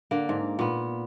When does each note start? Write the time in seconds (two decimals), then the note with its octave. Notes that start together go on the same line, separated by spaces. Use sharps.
0.11 D3 A#3
0.29 G#2
0.59 A#2 B3